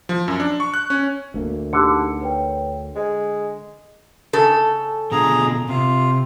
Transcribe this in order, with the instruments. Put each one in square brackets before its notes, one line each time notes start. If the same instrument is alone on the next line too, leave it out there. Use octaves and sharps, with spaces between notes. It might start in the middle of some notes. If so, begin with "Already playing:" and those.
[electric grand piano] F3
F#2
D4
C#6
F#6
C#4
[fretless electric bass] D2 A#3
[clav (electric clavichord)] D3 [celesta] D#4 G4 C#7
[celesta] B4 C#5 G5
[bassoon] G#3 [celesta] D#5
[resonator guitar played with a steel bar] C#3 A4
[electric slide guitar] B2 D3 F4 [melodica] G#4 A#5
[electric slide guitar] C3 [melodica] F4